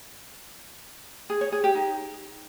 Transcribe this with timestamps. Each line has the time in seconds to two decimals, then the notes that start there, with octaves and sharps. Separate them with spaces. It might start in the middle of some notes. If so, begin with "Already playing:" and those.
1.30 G#4
1.41 C#5
1.52 G#4
1.64 G4
1.75 D#4